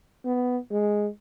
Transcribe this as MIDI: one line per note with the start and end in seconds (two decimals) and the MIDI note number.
0.25 0.58 59
0.71 1.07 56